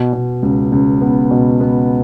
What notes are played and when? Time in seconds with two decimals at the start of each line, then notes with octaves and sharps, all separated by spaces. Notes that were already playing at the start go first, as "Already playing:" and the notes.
Already playing: B2
0.13 B2
0.43 C#2
0.72 C#2
1.01 B3
1.31 B2
1.61 B3